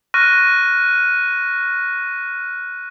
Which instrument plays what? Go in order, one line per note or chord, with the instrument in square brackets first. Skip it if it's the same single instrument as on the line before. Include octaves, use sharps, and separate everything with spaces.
[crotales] C#6 F6 F#6 A#6 D#7